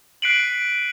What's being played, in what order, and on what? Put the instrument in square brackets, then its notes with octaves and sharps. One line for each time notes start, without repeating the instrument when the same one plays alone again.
[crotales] F#6 B6 C7 D7 D#7 F#7